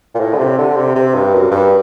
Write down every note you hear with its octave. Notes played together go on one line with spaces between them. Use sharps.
A#2
A2
D3
C3
D3
C3
C3
G2
F#2
G2